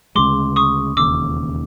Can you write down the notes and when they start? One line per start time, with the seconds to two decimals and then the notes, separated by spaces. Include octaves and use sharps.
0.15 D2 C#3 E3 G#3 C6 D6
0.56 C#6 D#6
0.97 E1 D#2 C#3 D6 E6